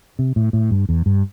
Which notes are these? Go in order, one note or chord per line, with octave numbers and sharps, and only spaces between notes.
C3
A2
A2
G2
E2
G2